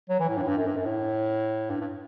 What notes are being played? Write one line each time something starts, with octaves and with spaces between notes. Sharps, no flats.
F#3
E3
A2
G2
A2
G2
F#2
G2
F#2
A2
G2
G2